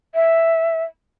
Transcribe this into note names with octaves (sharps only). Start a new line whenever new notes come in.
E5